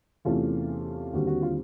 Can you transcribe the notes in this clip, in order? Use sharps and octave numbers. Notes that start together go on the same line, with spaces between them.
E2 C3 E3 A3 C#4 F4
D#2 D3 G3 C4 F#4
F#4
F4